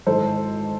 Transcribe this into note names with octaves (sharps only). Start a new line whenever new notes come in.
G#1 G#2 E3 A4 C5